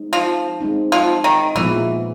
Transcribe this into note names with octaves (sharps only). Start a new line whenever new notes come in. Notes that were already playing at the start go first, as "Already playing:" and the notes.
Already playing: G#3 C4 D#4
F3
G#3 C4 D#4
F3
D#3
A#2 E3 F3 G#3 B3